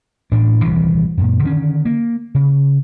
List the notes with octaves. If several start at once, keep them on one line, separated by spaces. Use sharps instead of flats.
A1 A2 D4
D#1 C2 C3 E3
F#2 A#2
D3 D#3 G3 C#4
A#3
C#3